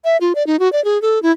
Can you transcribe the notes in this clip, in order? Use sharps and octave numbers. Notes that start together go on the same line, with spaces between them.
E5
F4
D5
D#4
F#4
D5
G#4
A4
E4